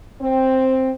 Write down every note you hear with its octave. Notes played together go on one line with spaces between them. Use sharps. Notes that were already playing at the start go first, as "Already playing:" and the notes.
C4